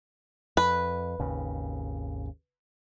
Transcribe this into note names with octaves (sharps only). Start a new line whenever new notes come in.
F2 B4
G#1 D#2 C#3